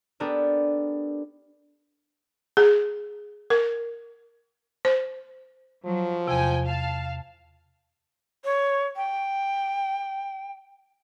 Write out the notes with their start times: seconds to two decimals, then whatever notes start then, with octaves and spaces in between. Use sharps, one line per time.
0.20 B3 D4 G4 A4 A#4
2.57 G#4
3.50 A#4
4.85 C5
5.85 F3 F#3
6.28 E2 C3 G5 G#5
6.66 F5 A5
8.44 C#5
8.96 G5